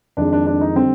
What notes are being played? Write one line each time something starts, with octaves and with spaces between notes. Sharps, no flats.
F2 D#3 G#3 D4
D4
D4
D#4
D3 G3 C4